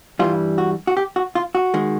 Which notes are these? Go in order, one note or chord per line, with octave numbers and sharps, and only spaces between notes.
G2 E3 G3 F4
F#4
F#4
G4
F#4
F4
F#4
D#3 G#3